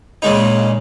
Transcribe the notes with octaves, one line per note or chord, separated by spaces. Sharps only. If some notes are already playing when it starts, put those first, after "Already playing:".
A#2 C#3 G#3 D#4